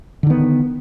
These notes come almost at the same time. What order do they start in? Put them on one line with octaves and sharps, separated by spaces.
D3 D#3 B3